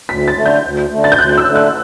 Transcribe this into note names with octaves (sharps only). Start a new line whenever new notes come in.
D2 B6
A6
D3 A3
G6
D2
D3 A3
A6
G6
D2 F#6
E6
D3 A3
F#6